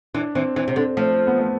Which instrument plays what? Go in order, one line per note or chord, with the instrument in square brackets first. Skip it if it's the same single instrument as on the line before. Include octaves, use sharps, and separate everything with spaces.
[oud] E3 [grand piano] D4
[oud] E3 [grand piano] C4
[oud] E3 [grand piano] C4
[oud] C3
[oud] D3 [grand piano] C4
[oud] F3 [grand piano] A3
[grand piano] B3
A3